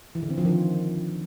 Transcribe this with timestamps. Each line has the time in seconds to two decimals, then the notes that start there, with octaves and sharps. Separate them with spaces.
0.15 E3
0.23 D3
0.30 C4
0.38 F3
0.45 D#3